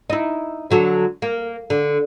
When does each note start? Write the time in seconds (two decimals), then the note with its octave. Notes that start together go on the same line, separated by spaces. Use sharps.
0.10 D#4 E4
0.71 D3 F#3 A4
1.22 A#3
1.70 D3